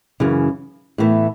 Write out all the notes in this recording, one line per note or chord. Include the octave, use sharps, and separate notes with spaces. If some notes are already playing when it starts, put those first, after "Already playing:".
F#2 C#3 E3
A2 E3 B3